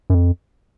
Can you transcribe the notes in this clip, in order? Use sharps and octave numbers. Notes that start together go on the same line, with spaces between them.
F#2
F2